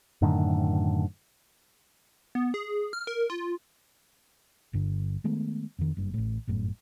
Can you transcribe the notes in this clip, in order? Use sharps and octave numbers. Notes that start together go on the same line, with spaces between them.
F#2 A2 D3 D#3
B3
G#4
F6
A#4
F4
G1 G2 D3
D#3 G#3 A3 B3
F2 D#3
F#1 G2
A1 A2
G1 F#2 A2